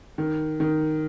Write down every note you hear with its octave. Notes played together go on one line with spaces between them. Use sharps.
D#3
D#3